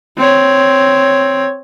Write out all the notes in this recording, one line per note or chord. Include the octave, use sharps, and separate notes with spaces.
C4 C#5